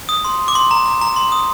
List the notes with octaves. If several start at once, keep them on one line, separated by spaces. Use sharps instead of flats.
D#6
C6
D6
C6
A#5
A#5
A#5
C6
D#6